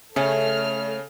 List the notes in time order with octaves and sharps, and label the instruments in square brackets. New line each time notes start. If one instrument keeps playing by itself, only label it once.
[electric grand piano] C#3 [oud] A3 C#4 [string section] A4 F6 [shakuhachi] C#5